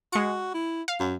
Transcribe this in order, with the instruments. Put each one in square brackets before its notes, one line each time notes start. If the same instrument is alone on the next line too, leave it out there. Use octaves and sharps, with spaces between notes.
[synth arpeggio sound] G#3 C#7 [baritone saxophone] F#4
[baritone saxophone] E4
[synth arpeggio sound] F5
[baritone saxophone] F#2